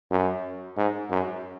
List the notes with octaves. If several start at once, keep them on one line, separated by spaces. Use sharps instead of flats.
F#2
G#2
F#2